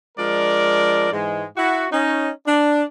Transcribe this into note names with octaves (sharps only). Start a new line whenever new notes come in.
F3 G#3 D4 A#4 D5
G#2 E3 G#3
E4 F#4
C#4 D#4
D4